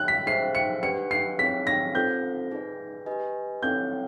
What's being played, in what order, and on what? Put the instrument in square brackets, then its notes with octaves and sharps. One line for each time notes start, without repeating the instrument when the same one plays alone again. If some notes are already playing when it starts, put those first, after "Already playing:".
Already playing: [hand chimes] C#5 [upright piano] F#6
[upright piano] B6
[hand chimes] D#4 G#4 C5 E5 [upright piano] C7
[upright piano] C#7
[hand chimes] D4 G4 B4 D5 F#5 [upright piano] C#7
[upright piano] C7
[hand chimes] C4 E4 G#4 C#5 [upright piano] B6
[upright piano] A#6
[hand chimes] C4 F4 A4 C5 [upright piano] G6
[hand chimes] D#4 G#4 B4 D5
G4 B4 D#5 G#5
[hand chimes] C4 E4 A4 C#5 F#5 [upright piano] G6